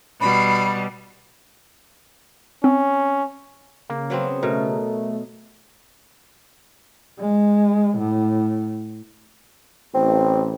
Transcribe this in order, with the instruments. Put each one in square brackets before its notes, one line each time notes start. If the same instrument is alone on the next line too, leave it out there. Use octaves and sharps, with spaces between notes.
[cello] B2 G3 [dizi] B5
[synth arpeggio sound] C4 [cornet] C#4
[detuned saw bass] C#3 [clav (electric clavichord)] A#3
[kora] F#3 B3 C4
[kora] B2 [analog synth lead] A3 [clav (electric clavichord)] A#4
[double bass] G#3
A2
[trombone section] A1 [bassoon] C4